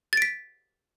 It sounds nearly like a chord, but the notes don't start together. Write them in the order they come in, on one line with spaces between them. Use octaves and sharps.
A6 D7 B6